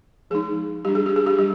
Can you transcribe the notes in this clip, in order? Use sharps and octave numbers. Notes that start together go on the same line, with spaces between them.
F3 G#3 D#4 G#4
G3 D4 G4
G#4
G4
G#4
G4
G3 G4